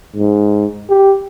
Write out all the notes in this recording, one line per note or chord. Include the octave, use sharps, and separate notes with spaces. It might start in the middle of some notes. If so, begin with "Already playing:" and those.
G#2
G4